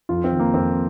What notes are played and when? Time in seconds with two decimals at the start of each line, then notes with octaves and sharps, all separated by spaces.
0.09 F2 F4
0.24 C4
0.31 D#3
0.40 A#3
0.54 F2 C4